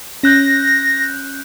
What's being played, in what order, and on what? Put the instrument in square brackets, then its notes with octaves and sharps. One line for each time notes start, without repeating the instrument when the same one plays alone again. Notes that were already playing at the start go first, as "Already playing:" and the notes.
[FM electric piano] C#4 F#6 G6 [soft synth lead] A#6